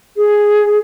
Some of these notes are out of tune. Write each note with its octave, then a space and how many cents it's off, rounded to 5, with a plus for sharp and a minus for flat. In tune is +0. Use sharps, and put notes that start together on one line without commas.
G#4 +5